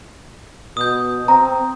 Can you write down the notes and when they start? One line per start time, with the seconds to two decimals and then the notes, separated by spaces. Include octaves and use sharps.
0.77 B2 D#6 G6
1.28 C4 A#5